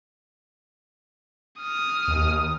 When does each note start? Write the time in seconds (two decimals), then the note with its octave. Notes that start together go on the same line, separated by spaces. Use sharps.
1.60 D#6 F6
2.08 D#2